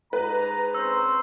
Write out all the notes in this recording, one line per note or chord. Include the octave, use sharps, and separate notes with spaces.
G#2 B4 A#5
C4 C#4 C5 E6